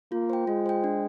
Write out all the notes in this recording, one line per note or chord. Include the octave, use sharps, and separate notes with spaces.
A#3 F4
C5 G5
G#3 F4
C5 G5
D4